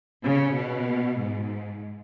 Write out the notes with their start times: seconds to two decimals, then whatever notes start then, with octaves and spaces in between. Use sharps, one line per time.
0.23 C#3
0.54 B2
1.18 G#2